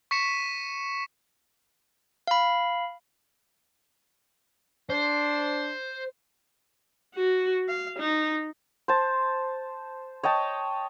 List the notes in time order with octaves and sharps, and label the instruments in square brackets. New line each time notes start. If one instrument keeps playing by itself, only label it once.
[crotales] C#6 B6 C#7 E7
[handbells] F5 B5
[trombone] D4 [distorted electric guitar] C5
[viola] F#4
F5
D#4
[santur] C5 A5
C#5 D#5 G5 A5